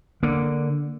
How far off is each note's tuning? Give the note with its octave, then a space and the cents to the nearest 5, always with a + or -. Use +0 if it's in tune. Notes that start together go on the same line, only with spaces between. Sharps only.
D3 +0 A#3 +0